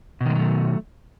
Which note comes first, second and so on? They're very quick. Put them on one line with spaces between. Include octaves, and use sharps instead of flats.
B2 D#3 G#3 F#3 A3